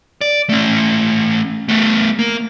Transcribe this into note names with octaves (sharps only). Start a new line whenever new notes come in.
D5
A3 C#4
A3 B3
A#3